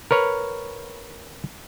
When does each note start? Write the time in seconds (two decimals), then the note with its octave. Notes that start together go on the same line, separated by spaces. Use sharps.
0.11 A#4 B4 C#5